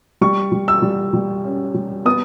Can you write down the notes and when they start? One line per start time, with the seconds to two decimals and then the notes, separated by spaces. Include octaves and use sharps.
0.21 G3 C#6
0.52 G3
0.68 E6
0.82 G3
1.13 G3
1.44 C#4
1.74 G3
2.05 B3 D#6